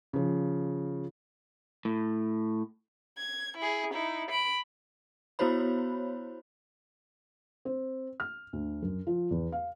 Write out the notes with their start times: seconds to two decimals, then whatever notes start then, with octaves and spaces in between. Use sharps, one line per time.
0.13 C#3 F3
1.85 A2
3.18 G#6
3.57 E4 G#4
3.93 D#4 E4
4.30 B5 D7
5.39 B3 E4 F#4 C5 C#5 B5
7.65 C4
8.20 F6
8.53 D2
8.82 F#2
9.07 F3
9.31 E2
9.52 F5